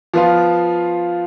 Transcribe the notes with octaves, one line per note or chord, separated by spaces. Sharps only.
F3 B3 F4